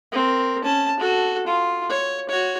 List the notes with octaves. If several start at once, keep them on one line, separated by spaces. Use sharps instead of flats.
C4 A#4
C#4 A5
F#4 A4
F4
C#5
F#4 C#5